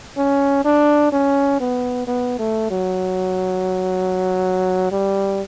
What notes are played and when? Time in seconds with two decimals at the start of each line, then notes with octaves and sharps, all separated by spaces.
0.18 C#4
0.65 D4
1.12 C#4
1.60 B3
2.07 B3
2.39 A3
2.71 F#3
4.92 G3